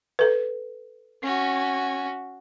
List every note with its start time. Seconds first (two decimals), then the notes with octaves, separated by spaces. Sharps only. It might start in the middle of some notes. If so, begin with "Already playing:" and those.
0.19 A4 B4
1.23 C#4 F#4